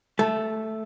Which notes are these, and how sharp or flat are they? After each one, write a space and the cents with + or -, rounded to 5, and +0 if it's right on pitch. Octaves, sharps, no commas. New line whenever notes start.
A3 +0 A5 -20